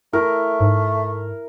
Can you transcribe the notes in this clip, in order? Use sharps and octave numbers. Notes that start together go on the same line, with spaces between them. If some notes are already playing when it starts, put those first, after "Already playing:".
A3 E4 A#4
G#2